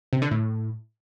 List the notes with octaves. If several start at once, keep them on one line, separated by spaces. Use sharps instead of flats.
C3
D3
A2